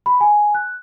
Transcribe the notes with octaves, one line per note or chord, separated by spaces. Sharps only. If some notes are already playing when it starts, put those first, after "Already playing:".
B5
G#5
F#6